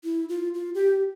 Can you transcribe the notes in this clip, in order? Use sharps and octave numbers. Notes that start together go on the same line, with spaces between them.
E4
F4
F4
G4